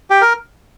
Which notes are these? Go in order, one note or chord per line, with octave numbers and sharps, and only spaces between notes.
G4
A#4